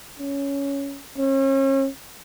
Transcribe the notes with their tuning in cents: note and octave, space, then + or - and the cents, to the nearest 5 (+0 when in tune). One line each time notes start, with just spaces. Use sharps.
C#4 +10
C#4 -40